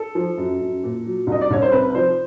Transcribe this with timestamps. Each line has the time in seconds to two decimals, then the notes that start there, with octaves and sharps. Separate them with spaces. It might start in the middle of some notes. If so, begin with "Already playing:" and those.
Already playing: A4
0.15 F3
0.37 F#2
0.61 F#2
0.83 A#2
1.05 F#3
1.27 C2 D#5
1.41 D5
1.51 C2 C#5
1.62 C5
1.72 C3 B4
1.95 F3 C5